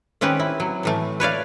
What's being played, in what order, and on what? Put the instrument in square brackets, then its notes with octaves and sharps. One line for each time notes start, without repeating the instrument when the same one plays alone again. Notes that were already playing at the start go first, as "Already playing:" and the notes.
[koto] D#3 C4 C#4 G4 B4
E4
F#3
A2 E3 A3
B4 C#5 D5 F5